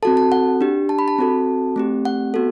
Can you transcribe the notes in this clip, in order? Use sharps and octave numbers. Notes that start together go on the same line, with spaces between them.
C4 F#4 A4 A5
A5
F#5
D4 G4
A5
B5
A5
C4 F#4 A4
A3 C4 G4
F#5
B3 F#4 A4